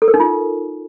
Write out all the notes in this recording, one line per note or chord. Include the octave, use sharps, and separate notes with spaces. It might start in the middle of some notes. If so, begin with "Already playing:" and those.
A4
A#4
D#4
F4